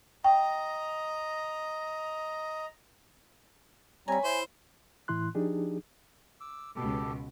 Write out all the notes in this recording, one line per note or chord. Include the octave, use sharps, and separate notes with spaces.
D#5 G5 A#5
G3 C4 C#5 G#5 A#5 B5
E4 C5
A2 E3 E4 C6 F#6
F3 D4 D#4 G4 G#4
D6 E6
C#2 B2 G4 A4